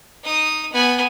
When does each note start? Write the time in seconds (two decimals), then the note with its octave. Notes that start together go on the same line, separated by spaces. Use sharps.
0.23 D#4 D#6
0.72 B3 G#5